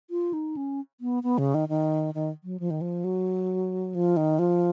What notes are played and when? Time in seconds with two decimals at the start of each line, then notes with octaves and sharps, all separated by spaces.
0.10 F4
0.33 D#4
0.57 C#4
1.01 B3
1.23 B3
1.38 C#3
1.54 D#3
1.69 D#3
2.14 D#3
2.44 F#3
2.60 F3
2.70 D#3
2.81 F3
3.04 F#3
3.95 F3
4.17 D#3
4.39 F3